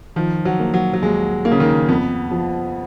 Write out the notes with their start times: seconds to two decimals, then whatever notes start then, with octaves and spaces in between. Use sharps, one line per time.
0.16 D#3 F3
0.45 F#3
0.60 A#3
0.74 F#3
0.94 F#3
1.02 D#2 G#3
1.45 A#3
1.52 C#3
1.60 D#3
1.88 F2 B3
2.31 F3